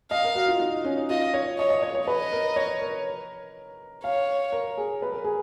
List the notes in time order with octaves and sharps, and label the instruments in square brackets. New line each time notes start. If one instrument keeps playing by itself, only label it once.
[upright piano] D#5 [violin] F5
[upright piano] A#4
F#4
F4
D#4
C#4
D#4
[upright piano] F4 [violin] D#5
[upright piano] C#5
[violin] C#5 [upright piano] D#5
[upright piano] D#5
C#5
C#5
[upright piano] B4 [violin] D#5
[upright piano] A#4
C#5
A#4
[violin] C#5 [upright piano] F5
[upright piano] A#4
G#4
B4
A#4
G#4